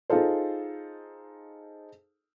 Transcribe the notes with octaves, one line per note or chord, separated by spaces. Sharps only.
D#4 F4 G#4 A4 C5